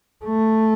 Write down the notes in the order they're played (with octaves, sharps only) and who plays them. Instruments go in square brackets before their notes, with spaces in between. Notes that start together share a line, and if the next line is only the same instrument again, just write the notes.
[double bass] A3